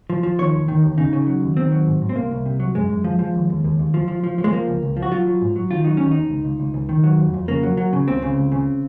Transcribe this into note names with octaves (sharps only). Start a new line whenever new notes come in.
F3
F3
D#3 C#5
D#2
D#3
D#2
C#3 D#4
C#3
F#3
D#2
D#3 C4
F#3
G#2
G#2
C4
C2 A#3
C2
C3
F#3
F#2 G#3
F#2
F3
F3
D#2
D#2
D#2
D#2
F3
F3
F3
F3
G#3
F3 A#3
C#2
C#2
F3
F#4
F#3 F4
F#3
G#2
F#3
D#3 F4
F#3 D#4
D#3 C#4
D#2 D#4
C#2
C#2
C#2
C#2
D#3
F#3
F2
F2
C#3 A#3
F#3
F#3
C#3
C#2 C4
C#3
C#2
C#3